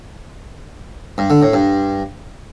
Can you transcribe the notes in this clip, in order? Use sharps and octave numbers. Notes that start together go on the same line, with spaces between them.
G2
D3
A2
G2